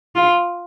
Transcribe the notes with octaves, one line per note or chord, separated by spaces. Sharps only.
F4